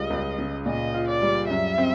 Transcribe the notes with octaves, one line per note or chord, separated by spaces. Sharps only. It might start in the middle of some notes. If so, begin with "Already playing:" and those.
Already playing: C#2 G3 F4 D#5
C#2
C#3
A#2 D#5
F4
D5
G3
F#2 E5
C4